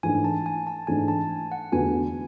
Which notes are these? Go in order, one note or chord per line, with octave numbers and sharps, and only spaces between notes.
G#2 E3 A3 D4 G#5
A5
G#5
A5
G#2 E3 A3 D4 G#5
A5
F#5
E2 D3 A3 D4 F#4 G#5